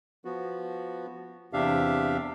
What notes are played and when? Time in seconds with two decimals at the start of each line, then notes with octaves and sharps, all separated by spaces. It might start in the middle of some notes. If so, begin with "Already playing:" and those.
0.25 F3 B3 F#4
1.53 E2 C3 D4 G4 E5 F5